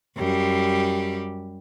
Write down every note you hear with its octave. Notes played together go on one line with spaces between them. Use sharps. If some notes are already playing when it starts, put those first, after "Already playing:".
F#2 G3 G4